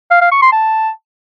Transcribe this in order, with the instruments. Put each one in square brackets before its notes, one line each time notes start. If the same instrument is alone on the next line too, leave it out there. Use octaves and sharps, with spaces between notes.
[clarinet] F5
F5
C#6
C6
A5